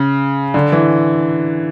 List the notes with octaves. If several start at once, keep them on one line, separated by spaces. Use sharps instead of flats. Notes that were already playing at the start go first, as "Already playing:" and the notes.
Already playing: C#3
D3
E3